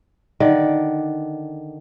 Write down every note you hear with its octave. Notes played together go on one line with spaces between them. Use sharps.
D3 D#3 D5